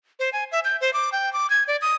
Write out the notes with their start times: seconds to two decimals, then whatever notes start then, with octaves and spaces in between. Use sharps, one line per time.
0.19 C5
0.33 G#5
0.52 E5
0.65 G6
0.81 C5
0.93 D6
1.12 G5
1.33 D6
1.50 G#6
1.68 D5
1.82 D#6